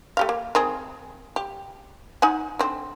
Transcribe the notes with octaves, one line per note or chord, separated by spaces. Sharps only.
A3 G4 F5
A#3
D#3 C4 G#4
G4
D#4 F#5 G#5
D3 C4